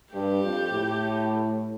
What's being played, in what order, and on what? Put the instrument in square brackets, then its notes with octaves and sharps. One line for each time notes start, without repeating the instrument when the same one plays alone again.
[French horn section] G2 [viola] G4
[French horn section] F2
A2